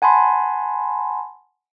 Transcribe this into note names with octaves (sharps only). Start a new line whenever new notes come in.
F#5 G#5 A5 B5 C6